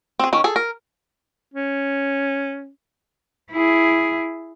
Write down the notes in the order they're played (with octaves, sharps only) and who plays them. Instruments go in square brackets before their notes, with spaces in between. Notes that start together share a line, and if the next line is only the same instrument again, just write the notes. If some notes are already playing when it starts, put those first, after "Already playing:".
[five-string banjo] C4 G#4
D#3 C#4
G#4 A4
A#4
[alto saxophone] C#4
[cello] E4 G#4